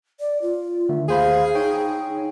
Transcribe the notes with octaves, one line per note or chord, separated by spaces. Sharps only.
D5
F4
D3 D#3 A3
D#2 G#4 C5 F5 B5
D#4 C#5 G5